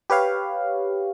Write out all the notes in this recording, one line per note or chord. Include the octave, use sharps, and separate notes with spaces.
G4 B4 C#5 F5